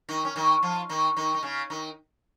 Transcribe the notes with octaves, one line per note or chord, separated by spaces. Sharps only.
D#3 D#4
C#4
D#3 D#4
F3 F4
D#3 D#4
D#3 D#4
D#4
C#3 C#4
D#3 D#4